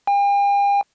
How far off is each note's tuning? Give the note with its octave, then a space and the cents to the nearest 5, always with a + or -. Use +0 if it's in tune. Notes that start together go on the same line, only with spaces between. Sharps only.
G5 +45